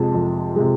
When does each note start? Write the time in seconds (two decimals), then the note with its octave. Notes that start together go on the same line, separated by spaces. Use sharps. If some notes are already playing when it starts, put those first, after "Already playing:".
Already playing: F2 C3 G#3 A5
0.14 F2
0.56 C3 G#3